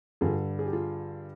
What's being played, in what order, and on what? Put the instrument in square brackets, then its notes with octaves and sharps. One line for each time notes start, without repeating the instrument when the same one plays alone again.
[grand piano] G2 D3 F4 G#4
G#4
G4
F4 G#4